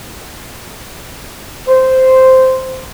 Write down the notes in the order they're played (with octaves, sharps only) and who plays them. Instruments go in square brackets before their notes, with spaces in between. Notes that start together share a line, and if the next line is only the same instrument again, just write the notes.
[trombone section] C5